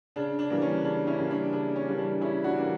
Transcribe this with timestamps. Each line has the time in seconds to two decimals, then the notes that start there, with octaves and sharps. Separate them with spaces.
0.16 C#3 D4
0.39 D4
0.50 E3 G3 A#3
0.62 C#4
0.84 C#3 D4
1.07 C#4 E4
1.19 E3 G3 A#3
1.31 D4
1.53 C#3 D4
1.76 C#4
1.87 E3 G3 A#3
1.98 D4
2.21 C#3 C#4 E4
2.44 D4 F#4
2.55 E3 G3 A#3